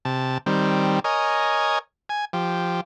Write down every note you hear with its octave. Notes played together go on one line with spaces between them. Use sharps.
C3 A5
D#3 G3 C4
A#4 C#5 D#5 G#5
G#5
F3 G4